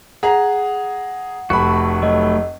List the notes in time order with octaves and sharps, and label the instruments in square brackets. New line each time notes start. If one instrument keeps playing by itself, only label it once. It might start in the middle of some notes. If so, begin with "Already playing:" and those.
[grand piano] G#4 A#5 [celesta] F#5
[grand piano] F1 B5 [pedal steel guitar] A3 F#4
[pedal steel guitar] F#3 A3 [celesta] D#5